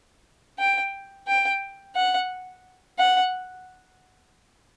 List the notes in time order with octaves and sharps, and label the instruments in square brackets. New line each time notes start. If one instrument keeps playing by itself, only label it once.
[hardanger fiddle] G5
G5
F#5
F#5